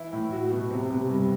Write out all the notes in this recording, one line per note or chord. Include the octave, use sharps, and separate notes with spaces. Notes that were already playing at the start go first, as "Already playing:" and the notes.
Already playing: E3 E4
A2
F#4
B2
C3
C3
G2